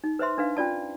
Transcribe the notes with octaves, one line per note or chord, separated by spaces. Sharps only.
D#4
B4 C5 E5 C6
D4 B4 F5
C#4 F4 D5 A5